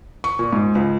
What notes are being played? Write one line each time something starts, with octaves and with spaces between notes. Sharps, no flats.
C#6
A#2
G#2
C#2